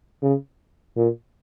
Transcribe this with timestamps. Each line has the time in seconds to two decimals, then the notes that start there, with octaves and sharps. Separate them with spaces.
0.23 C#3
0.97 A#2